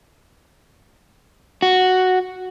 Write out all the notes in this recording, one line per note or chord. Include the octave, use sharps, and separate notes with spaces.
F#4